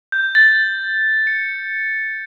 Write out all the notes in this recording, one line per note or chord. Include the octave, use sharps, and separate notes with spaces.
G6
A6
C#7